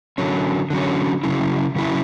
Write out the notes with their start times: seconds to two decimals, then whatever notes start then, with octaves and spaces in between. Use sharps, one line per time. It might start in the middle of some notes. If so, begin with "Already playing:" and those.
0.18 D3 F#3 C#4
0.70 D3 F#3 C#4
1.23 C#3 F#3 C#4 E4
1.76 C#3 F#3 C#4 E4